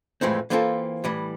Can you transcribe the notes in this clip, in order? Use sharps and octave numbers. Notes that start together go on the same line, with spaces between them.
F2 A2 E3 G#3 C4
E3 A#3 C4 F4 G#4 A4
A2 E3 G3